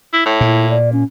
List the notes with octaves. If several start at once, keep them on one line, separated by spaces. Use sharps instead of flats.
E4
A2
A#2 E4
D5
C#4